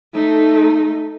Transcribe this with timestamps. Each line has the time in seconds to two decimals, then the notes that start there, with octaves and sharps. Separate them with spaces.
0.14 A3 D#4